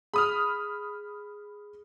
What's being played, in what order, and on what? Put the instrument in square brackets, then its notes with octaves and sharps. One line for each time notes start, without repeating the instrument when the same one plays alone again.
[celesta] G#4 [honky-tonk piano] B5 D#6 F6